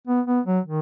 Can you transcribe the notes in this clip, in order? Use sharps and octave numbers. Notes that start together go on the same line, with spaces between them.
B3
B3
F#3
D#3